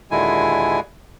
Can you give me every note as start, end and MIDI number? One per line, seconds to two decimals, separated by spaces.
0.11 0.80 39
0.11 0.80 46
0.11 0.80 50
0.11 0.80 56
0.11 0.80 64
0.11 0.80 80